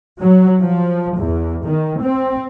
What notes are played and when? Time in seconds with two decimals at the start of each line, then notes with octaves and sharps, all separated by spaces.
0.22 F#3
0.63 F3
1.20 E2
1.67 D#3
2.02 C4